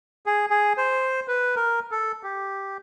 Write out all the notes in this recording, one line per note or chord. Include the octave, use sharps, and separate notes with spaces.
G#4
G#4
C5
B4
A#4
A4
G4